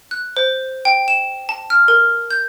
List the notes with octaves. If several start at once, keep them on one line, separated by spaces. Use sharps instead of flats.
F#6
C5
G5
E7
A5
F6
A#4
G6